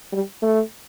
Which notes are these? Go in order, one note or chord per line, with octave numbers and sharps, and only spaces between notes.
G3
A3